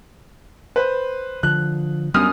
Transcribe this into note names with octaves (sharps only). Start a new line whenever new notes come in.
B4 C5
D3 F3 F#6
F#2 G3 B3 D4 D#6 F6